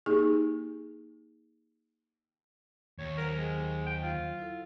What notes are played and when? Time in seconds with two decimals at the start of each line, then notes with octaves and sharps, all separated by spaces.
0.06 A#3 D#4 G4 G#4
2.99 D#2 C#5
3.18 F#3 A#4 C5 F#5
3.38 G#3
3.86 G5
4.03 F4
4.39 E4 A4